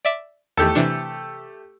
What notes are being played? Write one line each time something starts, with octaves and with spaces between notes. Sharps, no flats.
D5 E5 D6
E2 D#3 A3 G4 A4
C3 E3 D4